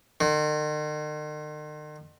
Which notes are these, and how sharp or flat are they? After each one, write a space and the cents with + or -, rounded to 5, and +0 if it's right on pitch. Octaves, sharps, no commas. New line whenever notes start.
D#3 -45